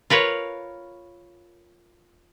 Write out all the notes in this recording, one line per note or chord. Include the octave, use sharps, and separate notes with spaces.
F4 A#4 B4 C#5